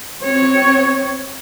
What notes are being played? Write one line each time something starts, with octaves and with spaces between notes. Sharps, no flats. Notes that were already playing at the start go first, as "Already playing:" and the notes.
C4 C#5